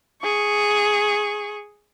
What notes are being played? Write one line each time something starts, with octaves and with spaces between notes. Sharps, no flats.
G#4 C#6